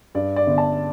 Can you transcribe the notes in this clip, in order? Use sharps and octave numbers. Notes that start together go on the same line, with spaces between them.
G2 D5
D5
G1
A5